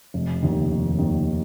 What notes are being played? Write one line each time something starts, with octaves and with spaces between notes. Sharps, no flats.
F1
D#2 D#3
F1
D#2 D#3